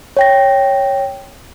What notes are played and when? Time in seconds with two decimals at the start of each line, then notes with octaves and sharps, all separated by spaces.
0.17 C#5 G5 A#6